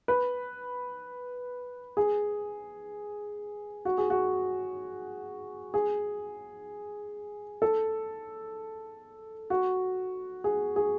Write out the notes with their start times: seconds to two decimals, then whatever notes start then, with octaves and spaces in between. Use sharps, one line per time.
0.08 B4
1.97 G#4
3.85 F#4
3.98 G#4
4.10 F#4
5.74 G#4
7.62 A4
9.50 F#4
10.44 G#4
10.76 G#4